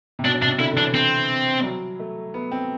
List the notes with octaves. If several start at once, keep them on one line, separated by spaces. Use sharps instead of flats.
C3
B2 D4
C3 D4
D3 E4
D3
E3 D4
C4
G3
F#3
A3
B3
C4